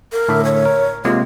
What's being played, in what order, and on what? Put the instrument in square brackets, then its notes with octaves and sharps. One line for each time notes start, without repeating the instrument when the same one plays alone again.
[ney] A#4
[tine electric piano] A2 D3 E5
[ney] C#5
[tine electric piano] A#4
[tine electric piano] C3 G#3 A#3 [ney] F4